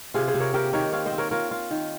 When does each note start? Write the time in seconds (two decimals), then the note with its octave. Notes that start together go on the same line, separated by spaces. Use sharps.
0.14 C3 F4 G#4
0.28 G#4 C5
0.34 C3
0.40 A#4 C#5
0.53 A#3 G4 A#4
0.73 D#3 A#4 C#5
0.93 C4 C#5 F5
1.06 C5 D#5
1.12 C4
1.18 A#4 C#5
1.31 F4 A#4 C#5
1.51 F4
1.71 D#3